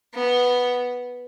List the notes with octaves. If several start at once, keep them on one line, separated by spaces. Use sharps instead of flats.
B3